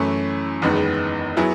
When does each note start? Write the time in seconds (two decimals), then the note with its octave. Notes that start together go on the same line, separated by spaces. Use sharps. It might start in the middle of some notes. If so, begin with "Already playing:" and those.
Already playing: F#2 E3 A3 C#4 E4
0.62 F#1 E2 D#3 G#3 B3
1.37 F#3 B3 E4 G#4